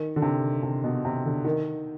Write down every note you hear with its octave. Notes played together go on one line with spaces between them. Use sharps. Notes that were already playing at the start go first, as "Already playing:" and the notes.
Already playing: D#3
D3
C3
C3
B2
C3
D3
D#3